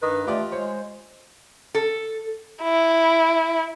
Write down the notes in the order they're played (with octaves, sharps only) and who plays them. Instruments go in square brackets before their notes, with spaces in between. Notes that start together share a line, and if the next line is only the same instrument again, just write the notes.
[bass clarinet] G2 [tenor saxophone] D#3 [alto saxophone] B4
[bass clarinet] A3 [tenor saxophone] F4 [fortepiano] G4 D5 D#5
[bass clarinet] G#3 [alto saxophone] C5 [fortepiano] C#5
[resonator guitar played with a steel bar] A4
[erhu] E4